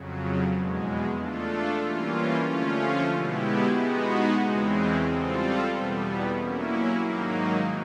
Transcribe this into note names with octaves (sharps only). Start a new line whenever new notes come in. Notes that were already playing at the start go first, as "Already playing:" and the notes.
Already playing: F2 C#3 F#3
E2 B2 G#3
A3 D4 F4 A4
E3 G3 A#3 C#4 F4
D3 F3 A3 C#4 F4
B2 G#3 B3 E4 G4
G#3 B3 D#4 F#4
E2 C#3 E3 G#3 C4
G3 C4 F4 A4
E2 B2 G3 B3
F#3 A#3 C#4 E4
G#2 D#3 F#3 A#3 D#4